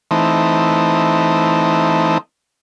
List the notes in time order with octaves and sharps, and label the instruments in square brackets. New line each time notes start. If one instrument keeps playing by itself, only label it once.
[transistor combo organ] E3 A3 C4 D#4